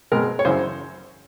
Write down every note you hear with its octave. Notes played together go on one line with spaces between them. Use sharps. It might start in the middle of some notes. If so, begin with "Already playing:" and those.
B2 G#3 C4 A#4
C#5
F#2 C#3 E3 C5